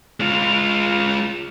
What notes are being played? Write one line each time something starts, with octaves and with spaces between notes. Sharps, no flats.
G#3 F4